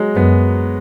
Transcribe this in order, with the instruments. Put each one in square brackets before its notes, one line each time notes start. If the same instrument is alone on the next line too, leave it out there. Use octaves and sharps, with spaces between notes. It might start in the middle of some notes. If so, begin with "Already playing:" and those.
Already playing: [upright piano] F#3 G#3
[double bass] F#2 [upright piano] B3